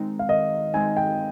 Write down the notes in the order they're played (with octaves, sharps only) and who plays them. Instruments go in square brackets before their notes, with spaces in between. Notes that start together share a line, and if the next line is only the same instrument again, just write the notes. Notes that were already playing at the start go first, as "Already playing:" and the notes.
Already playing: [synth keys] D#3 G#3 C4 D#4
[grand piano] F5
[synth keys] D#3 [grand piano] D#5
[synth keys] G#3 C4 D#4 [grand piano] G#5
[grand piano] G5